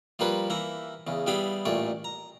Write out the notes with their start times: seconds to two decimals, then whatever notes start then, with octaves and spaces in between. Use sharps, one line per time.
0.19 F3 G3 A#3 A#4 B4 C#5
0.50 E3 A#3 E4 A#5
1.07 E2 C#3
1.27 G3 B3 E4 G4 G#4 F5
1.65 A1 A#2 A3 C#5 D5
2.04 A#5